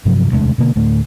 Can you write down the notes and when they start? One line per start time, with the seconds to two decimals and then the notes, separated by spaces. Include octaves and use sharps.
0.05 G2 C3 F3 F#3
0.31 E1 D2 C3 G#3
0.58 B2 D3 A#3
0.76 D2 A2 A3